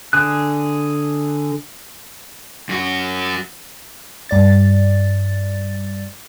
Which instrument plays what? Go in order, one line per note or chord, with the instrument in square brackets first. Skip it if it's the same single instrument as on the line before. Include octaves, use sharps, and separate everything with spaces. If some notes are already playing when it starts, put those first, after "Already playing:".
[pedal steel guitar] D3 G#4 F#6
[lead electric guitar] F#2 F#4
[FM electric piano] G2 D5 A6